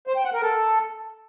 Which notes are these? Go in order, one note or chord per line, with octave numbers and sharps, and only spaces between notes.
C5
G5
F#5
A#4
A4